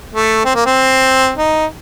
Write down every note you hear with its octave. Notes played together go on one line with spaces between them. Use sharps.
A3
C4
A#3
C4
D#4